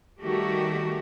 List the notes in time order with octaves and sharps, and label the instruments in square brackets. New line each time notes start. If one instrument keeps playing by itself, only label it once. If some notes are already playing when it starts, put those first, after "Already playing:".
[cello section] D#3 G3 A3 F#4 G4